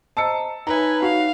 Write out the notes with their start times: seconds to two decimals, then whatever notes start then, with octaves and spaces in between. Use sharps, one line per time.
0.17 C5 D#5 A5 A#5 E6 C#7
0.67 D#4 B4 C#5 E5 G#5 A#5
1.02 F#4 F5